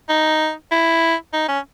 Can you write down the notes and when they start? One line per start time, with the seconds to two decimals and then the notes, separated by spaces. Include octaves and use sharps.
0.09 D#4
0.71 E4
1.33 D#4
1.48 C#4